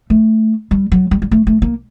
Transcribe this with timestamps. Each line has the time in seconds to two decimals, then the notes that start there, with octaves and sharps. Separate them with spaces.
0.10 A3
0.71 G3
0.92 F#3
1.11 G3
1.22 G3
1.31 A3
1.47 A3
1.62 A#3